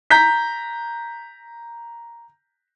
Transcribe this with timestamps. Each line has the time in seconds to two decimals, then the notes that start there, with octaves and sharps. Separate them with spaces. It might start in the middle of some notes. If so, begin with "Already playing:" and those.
0.10 A#5 G6 B6